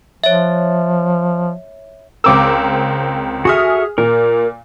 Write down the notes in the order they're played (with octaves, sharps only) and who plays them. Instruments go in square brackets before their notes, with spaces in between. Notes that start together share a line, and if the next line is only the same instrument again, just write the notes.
[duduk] F3 [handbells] C#5 E5
[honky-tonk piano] C#2 C4 A#4 [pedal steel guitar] D6 E6
[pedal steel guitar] F#4 A4 E5 [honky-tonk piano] G#4 D#6 F6
[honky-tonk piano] A#2 [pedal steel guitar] A#4